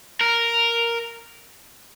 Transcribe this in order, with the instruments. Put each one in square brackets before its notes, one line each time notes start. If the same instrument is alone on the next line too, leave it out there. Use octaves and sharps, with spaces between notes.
[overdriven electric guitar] A#4